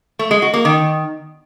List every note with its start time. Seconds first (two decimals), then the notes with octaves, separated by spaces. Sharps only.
0.19 A3
0.31 G#3
0.42 F#4
0.54 A#3
0.65 D#3